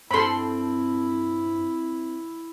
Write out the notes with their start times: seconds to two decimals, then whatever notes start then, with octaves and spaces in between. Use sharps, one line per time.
0.11 G2 C4 E4 A4 B5 C6